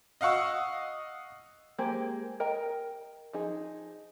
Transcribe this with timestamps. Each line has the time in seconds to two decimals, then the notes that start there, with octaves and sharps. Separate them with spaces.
0.21 D#5 F5 F#5 C#6 E6
1.78 G#3 A#3 G4 G#4 C5
2.40 A#4 D#5 G5
3.33 F3 D#4 G#4